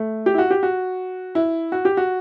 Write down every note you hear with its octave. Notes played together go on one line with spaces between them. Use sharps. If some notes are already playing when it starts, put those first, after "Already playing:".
Already playing: A3
G4
E4
F#4
G4
F#4
E4
F#4
G4
F#4